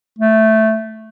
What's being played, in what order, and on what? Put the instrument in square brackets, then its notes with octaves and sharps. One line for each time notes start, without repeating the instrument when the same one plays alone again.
[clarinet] A3